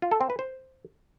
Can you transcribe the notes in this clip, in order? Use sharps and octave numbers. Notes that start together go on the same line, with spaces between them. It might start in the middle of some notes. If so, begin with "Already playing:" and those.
F4
A4
C4
B4
C5